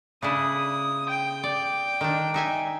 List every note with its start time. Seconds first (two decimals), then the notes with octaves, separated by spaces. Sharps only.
0.22 C#3 D4 E4 D#6
1.09 G5
1.43 D5
2.01 D#3 D4
2.34 D#4 E5 G#5